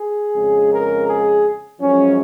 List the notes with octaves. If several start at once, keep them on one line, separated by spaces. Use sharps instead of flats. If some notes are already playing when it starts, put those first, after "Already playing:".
Already playing: G#4
F2 C#3 G#3
A#4
G#4
F#2 F3 G#3 C#4